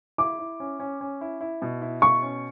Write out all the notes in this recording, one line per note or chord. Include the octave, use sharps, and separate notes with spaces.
E4 D6
E4
C#4
C#4
C#4
E4
E4
B2
E4
B2 C#6
C#4